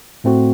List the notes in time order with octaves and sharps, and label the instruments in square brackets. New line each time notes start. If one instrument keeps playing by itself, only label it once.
[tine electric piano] A2 A3 C4 F#4